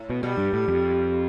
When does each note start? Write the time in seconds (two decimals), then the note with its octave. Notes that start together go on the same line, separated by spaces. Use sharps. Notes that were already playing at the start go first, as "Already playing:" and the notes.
Already playing: A2
0.10 B2
0.23 B2 G3
0.38 G2
0.53 A2
0.68 F2